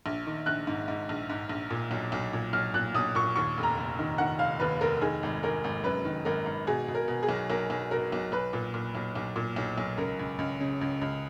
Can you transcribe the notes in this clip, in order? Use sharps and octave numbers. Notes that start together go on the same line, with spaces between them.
A#1
D#3
A#1 F#6
G#2
G#2
A#1
G#2
A#1
A#2
B1
B1
A#2
B1 F6
A#2 F#6
B1 D#6
A#2 C#6
D#2 C#6
F1
A#5
F1
D#3
D#3 F#5
F1 F5
D#2 B4
F1 A#4
D#3 G#4
G#1
G#1 A#4
G#1
F#2 B4
D#3
G#1 A#4
G#1
B2 G#4
B2
A#4
B2
G#4
B1
B1 A#4
B1
B2 A#4
B1
B1 B4
A#2
A#2
B1
B1
A#2
B1
B1
C#2 A#4
C#2
C#2
C#3
C#2
C#2